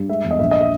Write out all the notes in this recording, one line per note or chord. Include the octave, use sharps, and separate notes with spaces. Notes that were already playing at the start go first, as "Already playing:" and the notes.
Already playing: G2
G#3 E5
E2
D#5
A#1 E5
D#5
E5